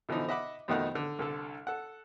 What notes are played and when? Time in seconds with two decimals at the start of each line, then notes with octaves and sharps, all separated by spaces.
0.09 B2 D3 E3 F3 D#4
0.29 D#5 E5 F#5 B5 D6
0.68 F2 B2 D#3 A3 D#4 F#5
0.95 D3
1.19 C2 D3 A4
1.67 A4 F#5